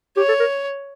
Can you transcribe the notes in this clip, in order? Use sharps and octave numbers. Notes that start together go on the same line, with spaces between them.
G4 C#5
A4
A#4